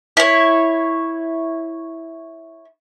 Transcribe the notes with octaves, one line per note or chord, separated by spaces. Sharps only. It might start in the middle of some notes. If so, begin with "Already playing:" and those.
E4 C#5